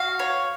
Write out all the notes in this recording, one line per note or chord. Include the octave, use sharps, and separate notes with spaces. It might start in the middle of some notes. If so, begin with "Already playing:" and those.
Already playing: F#4 F5
C#5